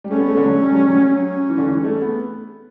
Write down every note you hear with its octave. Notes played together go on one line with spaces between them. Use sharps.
G3
A3 C#4
B3
A3
D3
F#3
A3
G3
F#3
G3
F#3
C#4
E3
D3
E3
G3
A3
B3